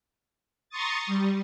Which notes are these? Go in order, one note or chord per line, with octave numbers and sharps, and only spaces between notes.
A#5 C6 C#6 D#6 A6
G3